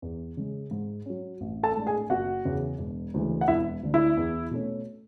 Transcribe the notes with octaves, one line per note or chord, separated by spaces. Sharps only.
E2
C#3 G#3
G#2
F#3 C#4
A1
A4 A5
A2 G#3 D4
G#4 G#5
F#1 F#4 F#5
E2 C#3
E1
D2 C#3 E3 G#3
F#5
E1 E4 E5
D2 D3
E4 E5
E2
B2 A3 C#4